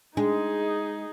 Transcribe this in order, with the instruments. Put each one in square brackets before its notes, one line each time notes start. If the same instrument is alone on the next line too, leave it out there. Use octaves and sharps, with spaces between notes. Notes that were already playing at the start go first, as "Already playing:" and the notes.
[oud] G#3 [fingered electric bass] D4 [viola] D#4 G#4